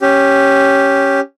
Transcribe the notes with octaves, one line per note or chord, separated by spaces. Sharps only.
C#4 G4